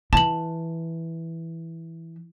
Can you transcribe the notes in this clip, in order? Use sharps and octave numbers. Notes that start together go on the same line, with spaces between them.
E3 A5 F#7